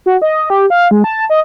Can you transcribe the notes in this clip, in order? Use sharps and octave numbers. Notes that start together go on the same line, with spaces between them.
F#4
D#5
G4
F5
G#3
A5
D#5